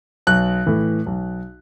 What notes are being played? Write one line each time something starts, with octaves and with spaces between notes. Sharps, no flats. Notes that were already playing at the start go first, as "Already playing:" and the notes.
B1 F#6
A2 E3 A3
B1